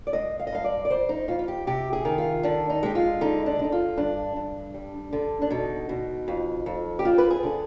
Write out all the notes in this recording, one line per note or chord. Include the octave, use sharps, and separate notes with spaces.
D5
G#3 D#5
F5
D#5
G2 F5
D5
D5
F2 C5
D#4
F2 F4
F4
G4
C3 G4
G#4
D#3
F4
D3 D4
D#4
G#3 G4
F4
D3 D#4
D4
D3 D#4
F4
G2 D4
G2
G3
D3
D4
B2 D#4
B2
F2
F2
G4
C4 F4
B4
G#4
D3